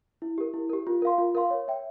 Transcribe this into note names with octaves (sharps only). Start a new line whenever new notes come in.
E4
G4 A#4
E4
G4 A#4
F4
A#4 F5 C6
F4
A#4 F5 C6
C#5
E5 G5